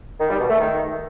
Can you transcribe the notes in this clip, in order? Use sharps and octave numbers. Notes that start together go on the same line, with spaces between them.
D#3
G3
B2
A3
D#3